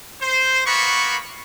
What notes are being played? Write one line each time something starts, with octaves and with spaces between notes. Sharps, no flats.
C5
A#3 B3 F#4 B5 C#6